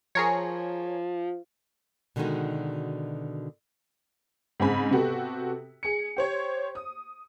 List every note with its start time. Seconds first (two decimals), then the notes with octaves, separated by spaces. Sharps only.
0.15 F3 G#4 A#4 C#5
2.16 B2 D3 D#3 G#3 D#4 F#4
4.60 G#2 C#3 C4 G#5 B5 B6
4.91 C3 B3 F#4 G4 A4
5.83 G#4 C#7
6.16 G4 C5 C#5
6.75 D#6